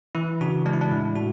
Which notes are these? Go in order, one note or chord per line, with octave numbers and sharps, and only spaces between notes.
E3 E4
C#3 D4 F#4
G#3 D4
E4
D4
A2 E4
A2 D4 F#4